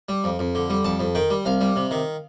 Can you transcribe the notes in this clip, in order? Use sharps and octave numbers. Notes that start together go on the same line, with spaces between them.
G3
F2
F2
D3
G3
F2 A5
F2
D#3 G5
G3
C2 F5
G3
C3
D#3